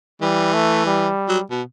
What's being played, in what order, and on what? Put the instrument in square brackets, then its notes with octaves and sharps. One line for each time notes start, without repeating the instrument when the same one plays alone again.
[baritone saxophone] E3 [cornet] G3
[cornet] A3
G3
[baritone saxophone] F#3
B2